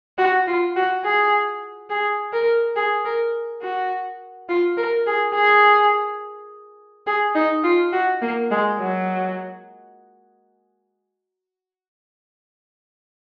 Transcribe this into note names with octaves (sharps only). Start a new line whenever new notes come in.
F#4
F4
F#4
G#4
G#4
A#4
G#4
A#4
F#4
F4
A#4
G#4
G#4
G#4
D#4
F4
F#4
A#3
G#3
F#3